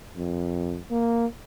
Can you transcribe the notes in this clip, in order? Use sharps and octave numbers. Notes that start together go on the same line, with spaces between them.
F2
A#3